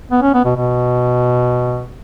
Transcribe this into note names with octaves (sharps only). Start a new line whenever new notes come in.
B3
C#4
B3
B2
B2